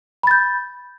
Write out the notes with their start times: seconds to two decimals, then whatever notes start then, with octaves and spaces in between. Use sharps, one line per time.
0.23 B5
0.27 A6
0.31 G6